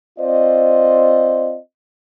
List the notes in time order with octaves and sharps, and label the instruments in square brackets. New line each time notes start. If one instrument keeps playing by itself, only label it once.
[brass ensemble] C4 F4 C5 D5 D#5